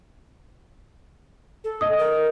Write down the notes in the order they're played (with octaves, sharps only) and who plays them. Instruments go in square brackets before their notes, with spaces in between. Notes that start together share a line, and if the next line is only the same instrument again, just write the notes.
[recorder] A4
[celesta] D#5 D#6
[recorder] A#4